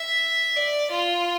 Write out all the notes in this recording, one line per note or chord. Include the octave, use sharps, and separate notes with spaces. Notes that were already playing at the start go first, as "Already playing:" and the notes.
Already playing: E5
D5
F4